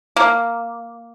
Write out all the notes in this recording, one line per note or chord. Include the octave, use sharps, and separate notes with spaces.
A#3